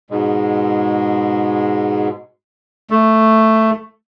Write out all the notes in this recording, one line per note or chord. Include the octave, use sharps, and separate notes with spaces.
G#2 B2 G#3
A3